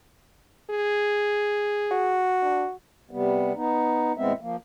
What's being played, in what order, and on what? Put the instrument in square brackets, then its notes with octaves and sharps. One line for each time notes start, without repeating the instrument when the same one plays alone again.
[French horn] G#4
[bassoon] F#4
[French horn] D4
[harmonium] C3 G3 B3
B3 D#4
E2 A2 G#3 B3 C4 E5
F3 A#3